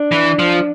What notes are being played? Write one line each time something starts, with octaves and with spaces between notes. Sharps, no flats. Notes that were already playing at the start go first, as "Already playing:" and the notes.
Already playing: D4
E3
F3